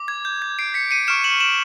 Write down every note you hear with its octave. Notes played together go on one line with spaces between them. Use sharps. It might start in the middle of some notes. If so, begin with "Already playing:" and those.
Already playing: D6
G#6
G6
G#6
C7 D7
B6 C#7
C#7 D#7
C#6 F6 D7 E7
E7 F#7
E7 F#7